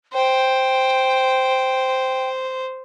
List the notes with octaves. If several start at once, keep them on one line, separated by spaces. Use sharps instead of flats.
C5 G5